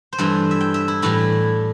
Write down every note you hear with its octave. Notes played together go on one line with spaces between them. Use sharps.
C5
G2 E3 G3 A4
E5
G5
E5
E4
A2 E3 G3 E4